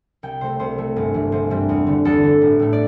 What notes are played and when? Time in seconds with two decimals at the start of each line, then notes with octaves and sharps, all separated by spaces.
0.23 C2 G5
0.41 C3 A3 C4 C5
0.59 C2 C5
0.78 C3 A3 C4
0.96 G1
1.14 G2 E3 G3 C4
1.32 G1 C5
1.50 G2 E3 G3 C4
1.69 E2
1.87 D3 A3
2.05 E2 A4
2.23 D3 A3
2.41 A1
2.59 A2 A3
2.73 D5